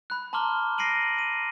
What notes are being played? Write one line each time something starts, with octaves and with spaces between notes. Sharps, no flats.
B5 F#6
A5 A#5 C6 D6 F6 G7
A#6 C7 D7 D#7 F#7
D#7